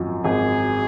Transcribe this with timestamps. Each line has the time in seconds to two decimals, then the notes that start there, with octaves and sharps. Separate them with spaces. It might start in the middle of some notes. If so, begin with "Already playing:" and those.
Already playing: G#1 F#2 F3
0.25 G#1 G#4